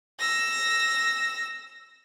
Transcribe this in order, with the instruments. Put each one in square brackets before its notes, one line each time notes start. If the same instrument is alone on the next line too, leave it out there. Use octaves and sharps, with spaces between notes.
[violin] E6 A#6